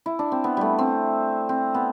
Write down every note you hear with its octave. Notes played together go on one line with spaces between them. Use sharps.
E4
D4
C4
B3
G3 A3
C4
C4
B3